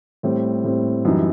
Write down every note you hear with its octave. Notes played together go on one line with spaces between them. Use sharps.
A2 G3 C4
A2 G3 C4
F#2 E3 G3 D#4